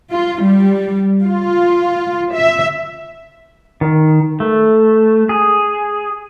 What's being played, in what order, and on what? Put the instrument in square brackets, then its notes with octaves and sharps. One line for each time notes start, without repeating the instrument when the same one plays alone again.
[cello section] F4
G3
F4
E5
[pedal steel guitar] D#3
A3
G#4